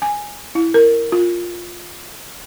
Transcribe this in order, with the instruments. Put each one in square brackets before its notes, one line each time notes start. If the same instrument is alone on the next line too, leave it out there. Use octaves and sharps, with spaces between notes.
[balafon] G#5
E4
A#4
F4